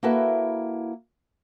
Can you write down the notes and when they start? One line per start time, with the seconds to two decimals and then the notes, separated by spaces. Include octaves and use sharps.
0.03 A#3 E4 F#4 A4 B4 E5